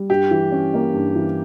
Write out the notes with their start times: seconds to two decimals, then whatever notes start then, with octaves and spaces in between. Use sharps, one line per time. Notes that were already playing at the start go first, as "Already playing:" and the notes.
Already playing: G3
0.10 G2 G4
0.31 E3
0.52 C#4
0.74 A#3
0.94 G2
1.15 E3